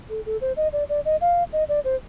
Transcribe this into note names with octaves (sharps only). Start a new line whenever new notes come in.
A4
A4
C5
D#5
D5
D5
D#5
F5
D#5
D5
C5